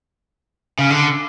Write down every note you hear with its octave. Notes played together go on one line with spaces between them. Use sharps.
C#3
D3